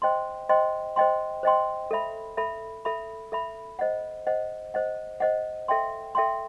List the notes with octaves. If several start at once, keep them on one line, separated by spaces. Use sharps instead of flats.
C5 D#5 G5 C6
C5 D#5 G5 C6
C5 D#5 G5 C6
C5 D#5 G5 C6
A4 E5 B5
A4 E5 B5
A4 E5 B5
A4 E5 B5
C5 D#5 F#5
C5 D#5 F#5
C5 D#5 F#5
C5 D#5 F#5
A4 E5 G5 C6
A4 E5 G5 C6